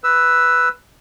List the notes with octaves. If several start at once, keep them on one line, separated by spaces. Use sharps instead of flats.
B4 E6